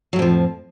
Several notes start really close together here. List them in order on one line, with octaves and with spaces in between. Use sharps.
F#3 A2 F2 F3